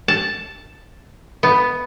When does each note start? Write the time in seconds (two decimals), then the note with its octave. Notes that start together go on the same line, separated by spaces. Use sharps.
0.08 A5
1.43 B3